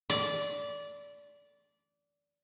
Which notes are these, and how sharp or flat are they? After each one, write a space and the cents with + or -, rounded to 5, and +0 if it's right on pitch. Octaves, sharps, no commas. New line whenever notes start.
D5 -20